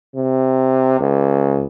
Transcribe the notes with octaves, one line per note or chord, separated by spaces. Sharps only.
C3
C#2